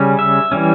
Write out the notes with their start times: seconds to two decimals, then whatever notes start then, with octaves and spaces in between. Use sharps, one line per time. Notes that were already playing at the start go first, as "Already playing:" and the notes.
Already playing: C#3 G3 C#4
0.19 E5
0.52 E3 G3 C#4